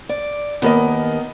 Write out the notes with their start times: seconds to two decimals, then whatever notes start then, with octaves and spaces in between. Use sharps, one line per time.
0.09 D5
0.62 D#2 B3 A#4 D#5